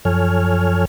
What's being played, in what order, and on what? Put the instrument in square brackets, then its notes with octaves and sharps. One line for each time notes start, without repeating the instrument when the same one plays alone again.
[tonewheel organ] F#2 F3 A4 C#5 G#5 F6